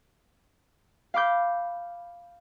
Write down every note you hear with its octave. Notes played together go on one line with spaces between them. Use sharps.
F5 B5 D6 G6